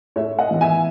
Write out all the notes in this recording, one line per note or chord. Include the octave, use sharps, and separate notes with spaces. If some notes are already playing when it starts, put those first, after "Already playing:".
A2 C#5 E5
D#5 F#5
E3 B3
E5 G#5